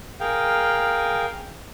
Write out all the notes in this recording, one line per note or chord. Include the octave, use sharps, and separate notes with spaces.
G#4 A#4 F5 G5